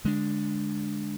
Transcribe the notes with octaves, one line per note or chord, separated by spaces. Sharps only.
D3 G#3 D4